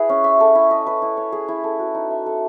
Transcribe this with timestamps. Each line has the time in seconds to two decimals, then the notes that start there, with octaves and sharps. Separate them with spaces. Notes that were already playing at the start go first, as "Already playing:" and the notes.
Already playing: E4 G#4 B4
0.09 C#4
0.24 E5
0.40 A4
0.55 E4
0.71 D#5
0.86 B4
1.02 E4
1.17 C#5
1.32 G#4
1.48 E4
1.64 A4
1.79 F#4
1.95 D#4
2.10 E5
2.26 A4